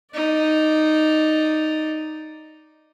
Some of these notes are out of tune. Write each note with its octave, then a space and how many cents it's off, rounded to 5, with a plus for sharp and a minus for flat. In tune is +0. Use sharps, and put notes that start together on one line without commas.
D#4 -5 D5 +0